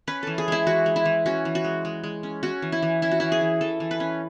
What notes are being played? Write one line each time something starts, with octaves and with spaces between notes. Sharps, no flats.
C#4 B4
E3 A4
G#4
G#3 E4
E3 F#4
G#3
E4
E3
C#4 F#4
E3
F#4
G#3
G#3
G#3
C#4
C#4 F#4
E3
E4
E3
C#4 E4
F#4
E3 E4
G#4
E3
E3 A4
E3
B4
C#4